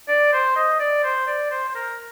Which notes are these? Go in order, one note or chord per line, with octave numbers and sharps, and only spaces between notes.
D5
C5
D#5
D5
C5
D5
C5
C5
A#4